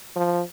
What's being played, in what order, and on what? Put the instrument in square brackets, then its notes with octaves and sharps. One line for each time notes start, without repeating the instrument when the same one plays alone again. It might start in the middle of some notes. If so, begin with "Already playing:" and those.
[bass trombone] F3